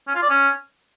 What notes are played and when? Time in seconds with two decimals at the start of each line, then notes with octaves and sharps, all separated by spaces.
0.08 C#4
0.15 F4
0.22 D5
0.30 C#4